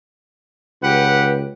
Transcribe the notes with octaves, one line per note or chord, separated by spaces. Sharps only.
C#2 G4 B4 F#5